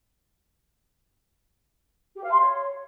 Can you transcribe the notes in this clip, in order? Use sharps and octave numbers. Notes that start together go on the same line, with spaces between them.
G4
F5
C6
C#5